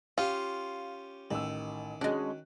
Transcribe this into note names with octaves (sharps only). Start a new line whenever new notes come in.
C#4 F4 G4 F5
A1 D#3 E6
G#3 C#4 D4 F#4 F#6